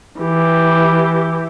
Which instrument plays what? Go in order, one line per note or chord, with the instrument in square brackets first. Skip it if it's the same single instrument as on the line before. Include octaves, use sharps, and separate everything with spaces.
[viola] E3 G4